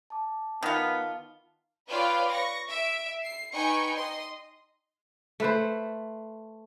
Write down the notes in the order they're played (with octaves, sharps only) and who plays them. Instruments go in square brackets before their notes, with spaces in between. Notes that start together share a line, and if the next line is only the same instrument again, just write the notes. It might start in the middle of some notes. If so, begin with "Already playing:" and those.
[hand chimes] A5 D6
[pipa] D#3 F4 [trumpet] B3
[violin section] F4 B4 C#5 D5 F5 G5
C#6 A#6
E5 D7
C7
D#4 B4 G5 G#5 C#6 C#7
D#5 C6
[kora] A3 B4 C5